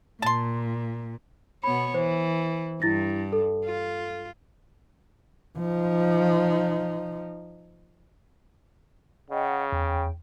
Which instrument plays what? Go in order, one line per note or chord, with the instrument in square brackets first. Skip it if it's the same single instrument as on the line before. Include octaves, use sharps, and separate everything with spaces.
[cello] A#2 [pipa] A5 C6
[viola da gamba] B2 B3 C#5 [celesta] B5
[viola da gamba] E3 [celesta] C5
[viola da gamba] G2 [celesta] E4 A6 A#6
[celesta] A4
[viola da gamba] F4
[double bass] F3 D#4
[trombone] C#3 [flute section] D#5 F#5 G5
[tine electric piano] E2 [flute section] G5